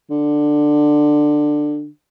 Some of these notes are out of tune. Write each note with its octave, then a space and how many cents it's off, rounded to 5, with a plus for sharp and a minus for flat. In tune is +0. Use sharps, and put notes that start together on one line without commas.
D3 +15